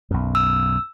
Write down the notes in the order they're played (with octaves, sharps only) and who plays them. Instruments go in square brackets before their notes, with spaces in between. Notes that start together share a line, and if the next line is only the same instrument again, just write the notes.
[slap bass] B1 F#2
[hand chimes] E6